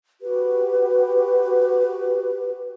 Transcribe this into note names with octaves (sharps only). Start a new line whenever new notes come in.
F#4 G4 B4